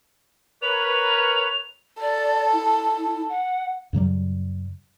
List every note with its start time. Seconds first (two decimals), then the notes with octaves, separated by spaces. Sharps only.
0.62 A#4 B4 C#5 F7
2.01 A4 D5
2.53 E4
3.29 F#5
3.93 F#2 C#3 F#3 G3